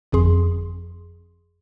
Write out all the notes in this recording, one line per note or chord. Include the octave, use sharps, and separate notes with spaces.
G1 F2 G#4 C6